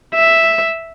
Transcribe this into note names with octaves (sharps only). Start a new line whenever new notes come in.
E5